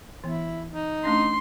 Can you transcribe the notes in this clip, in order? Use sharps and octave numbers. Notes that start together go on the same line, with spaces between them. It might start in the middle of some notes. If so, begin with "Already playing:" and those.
E3 B3 E4
D#4
A3 C#4 D4 C6